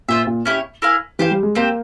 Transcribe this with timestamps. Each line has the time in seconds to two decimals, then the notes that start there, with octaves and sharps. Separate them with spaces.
0.08 A#2 F4 C5 E5
0.27 A#2
0.45 C#4 E4 G4 C#5
0.82 E4 A#4 F5 G#5
1.19 E3 G4 C5 F5
1.31 G3
1.43 G#3
1.55 A#3 C4 G4 C5